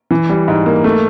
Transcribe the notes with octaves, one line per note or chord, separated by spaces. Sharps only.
E3
G3
G#2
A#3
A3